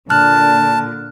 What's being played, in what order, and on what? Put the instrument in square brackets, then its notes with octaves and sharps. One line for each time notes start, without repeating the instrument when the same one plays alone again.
[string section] A#2 D3 [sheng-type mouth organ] A5 [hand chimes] F6 F#6